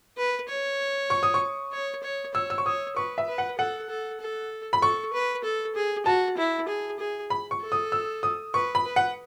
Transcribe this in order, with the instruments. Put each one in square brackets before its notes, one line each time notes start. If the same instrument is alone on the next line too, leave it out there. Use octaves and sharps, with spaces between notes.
[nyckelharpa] B4
C#5
[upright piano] C#6
D#6
C#6
[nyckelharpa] C#5
C#5
[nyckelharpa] C#5 [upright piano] E6
[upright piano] E6
C#6
[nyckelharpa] C#5 [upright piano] D#6
[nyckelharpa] B4 [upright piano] C#6
[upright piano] E5
[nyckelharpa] B4
[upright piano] F#5
[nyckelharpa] A4 [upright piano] F#5
[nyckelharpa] A4
A4
[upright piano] B5
[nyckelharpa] A4 [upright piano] C#6
[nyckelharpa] B4
A4
G#4
[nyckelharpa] F#4 [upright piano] A5
[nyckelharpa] E4
G#4
G#4
[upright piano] B5
C#6
[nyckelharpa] A4
[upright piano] D#6
E6
D#6
[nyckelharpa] B4 [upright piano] C#6
[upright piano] B5
[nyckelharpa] B4
[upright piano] F#5